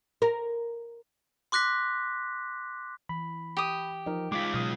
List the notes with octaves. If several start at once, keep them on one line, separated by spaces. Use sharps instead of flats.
A#4
C6 D6 F#6 A#6 B6
E3 B5
G4 D#6
F3 D#4 A#4 D#5
G#3 F4 D6 B6
B2 F#3 F5 D#6